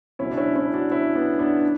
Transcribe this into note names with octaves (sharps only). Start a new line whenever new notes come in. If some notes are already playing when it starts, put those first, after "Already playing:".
C#2 B2 F#3 C#4 E4
D4
C#4 E4
C#4 E4
D4 F#4
C#4 E4
B3 D4
B3 D4
D4